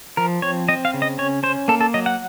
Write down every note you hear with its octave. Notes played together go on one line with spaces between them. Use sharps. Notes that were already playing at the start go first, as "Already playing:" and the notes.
F3 A#4
C4 C#5
C4 D#5
F5
C#3
D#5
C#4 C#5
C#4 C5
A#3 A4
A4
F#3 D#5
F#5